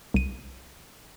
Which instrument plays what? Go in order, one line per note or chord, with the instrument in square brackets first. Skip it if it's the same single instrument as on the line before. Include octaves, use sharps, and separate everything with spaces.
[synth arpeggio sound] C2 D#7